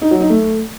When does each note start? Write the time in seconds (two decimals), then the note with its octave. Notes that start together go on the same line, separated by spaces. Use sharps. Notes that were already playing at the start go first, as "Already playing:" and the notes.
0.02 D#4
0.11 F#3
0.21 D#4
0.30 A3